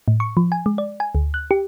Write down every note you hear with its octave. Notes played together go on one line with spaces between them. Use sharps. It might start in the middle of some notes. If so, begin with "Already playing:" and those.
A2
C#6
F3
G#5
G#3
D5
G#5
D2
F#6
G4